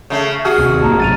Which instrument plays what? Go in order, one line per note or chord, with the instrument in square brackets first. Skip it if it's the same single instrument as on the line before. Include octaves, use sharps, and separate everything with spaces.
[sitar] C#3 A3
[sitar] F#4 G#4 [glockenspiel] F6
[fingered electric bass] D#2 C3
[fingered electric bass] A#1 A2 A#3 [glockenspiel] A5 A#5
[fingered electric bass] F#2 C3 [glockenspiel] A6 D#7 F7